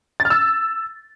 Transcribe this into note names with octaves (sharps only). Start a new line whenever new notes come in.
A6
F6
E6